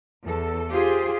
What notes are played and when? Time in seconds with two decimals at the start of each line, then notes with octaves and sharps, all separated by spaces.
0.24 E2 A4
0.70 F4 G4 G#4 C5